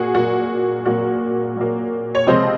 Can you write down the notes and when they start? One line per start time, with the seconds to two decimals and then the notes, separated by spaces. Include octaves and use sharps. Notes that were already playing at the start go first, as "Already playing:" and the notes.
Already playing: A#2 A#3 F#4 G#4
0.14 A#2 F#3 A#3 F#4
0.85 A#2 F#3 A#3 F#4
1.57 A#2 F#3 A#3
2.15 C#5
2.27 C#2 C3 F3 G#3 C4 C5 D#5